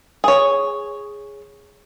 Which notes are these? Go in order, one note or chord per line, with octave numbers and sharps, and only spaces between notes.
G#4 C#5